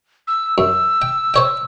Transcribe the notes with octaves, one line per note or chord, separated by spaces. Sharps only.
E6
F#2 E6
G5
C5 C#5 G5